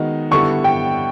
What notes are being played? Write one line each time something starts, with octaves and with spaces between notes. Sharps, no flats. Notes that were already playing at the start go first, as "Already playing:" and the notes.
Already playing: D#3 G#3 B3 D#4 F#4
D3 G3 B3 E4 A4 C#6
G5